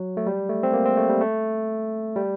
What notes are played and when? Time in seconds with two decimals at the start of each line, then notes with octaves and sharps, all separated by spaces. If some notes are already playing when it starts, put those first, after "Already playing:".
Already playing: F#3
0.17 A3
0.27 G3
0.49 A3
0.63 C4
0.73 A#3
0.85 C4
0.97 A3
1.09 G3
1.21 A3
2.16 G3